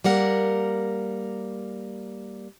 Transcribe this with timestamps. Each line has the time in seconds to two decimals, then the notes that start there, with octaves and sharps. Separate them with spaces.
0.04 G3 A#3 A#4 F#5